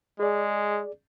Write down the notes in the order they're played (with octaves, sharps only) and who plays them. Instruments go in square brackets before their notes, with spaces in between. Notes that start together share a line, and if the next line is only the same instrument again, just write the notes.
[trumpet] G#3 [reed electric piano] G#4 D5